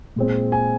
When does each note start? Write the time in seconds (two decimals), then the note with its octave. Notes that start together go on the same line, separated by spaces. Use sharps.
0.16 A#2 G#3 C4
0.52 G#5